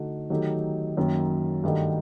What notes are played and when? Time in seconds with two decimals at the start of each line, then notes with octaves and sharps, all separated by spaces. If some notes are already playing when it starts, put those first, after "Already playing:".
Already playing: D3 A3 D#4 F#4
0.30 D#3 F#3 A3 D#4 G4
0.97 F#2 D#3 F#3 A#3
1.64 G2 D#3 A3 D#4 F#4